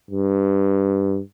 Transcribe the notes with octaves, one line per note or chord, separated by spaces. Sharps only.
G2